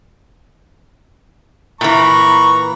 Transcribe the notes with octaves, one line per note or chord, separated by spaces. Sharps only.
A#2 E3 A#5 B5 C#6